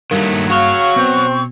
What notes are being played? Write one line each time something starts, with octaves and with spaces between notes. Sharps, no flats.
G2 D#3 F#3 A3 A#3
C#3 F#3 F#4 C#5 F5 C#6
B2 C4